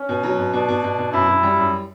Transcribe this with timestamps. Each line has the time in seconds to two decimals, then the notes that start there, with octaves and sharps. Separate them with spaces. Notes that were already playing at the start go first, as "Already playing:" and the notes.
Already playing: C#4
0.09 B2
0.23 F#3
0.39 B2
0.53 B2 D4
0.68 B2
0.84 B2
0.99 B2
1.13 F#2 E4
1.28 F#2
1.43 G3
1.58 F#2